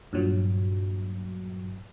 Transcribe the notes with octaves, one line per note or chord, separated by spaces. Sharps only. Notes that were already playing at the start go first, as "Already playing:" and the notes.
G2 A#2 F#3